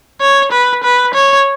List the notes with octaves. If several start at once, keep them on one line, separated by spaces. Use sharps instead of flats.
C#5
B4
B4
C#5